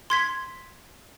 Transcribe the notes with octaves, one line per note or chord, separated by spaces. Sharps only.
C6 G#6 B6